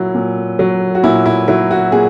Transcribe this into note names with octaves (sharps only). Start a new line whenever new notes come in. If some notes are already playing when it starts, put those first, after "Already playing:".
Already playing: A#2 F#3 E4
A#2
F#3
F#4
A#2 E4
E4
F#3 E4
F#4
A#2 G#4